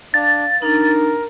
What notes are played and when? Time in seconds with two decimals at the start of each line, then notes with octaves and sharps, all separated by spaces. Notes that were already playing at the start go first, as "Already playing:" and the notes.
0.14 D4 F5 A6
0.62 D4 D#4 A#4